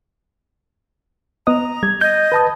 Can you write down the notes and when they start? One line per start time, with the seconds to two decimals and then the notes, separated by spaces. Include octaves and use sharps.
1.47 B3 D#5 A#5 D#6
1.83 G3 G#6
2.01 D#5 G6
2.32 B4 A5 D#6